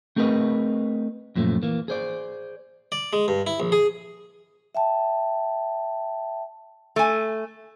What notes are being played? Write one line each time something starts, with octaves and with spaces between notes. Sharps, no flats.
A3 C4 G#4 A#4 B4 D#5
F#2 A#2 F3 A3
E3 A#3
G#4 C5 D5
D5
G#3
G2
E4
A#1
G#4
E5 G5 A5
A3 G#5